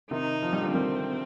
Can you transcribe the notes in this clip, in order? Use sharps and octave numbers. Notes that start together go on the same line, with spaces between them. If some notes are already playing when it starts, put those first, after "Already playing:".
C3 D#3 D#4
F3
G3
D3 F3
D#3 G3 C4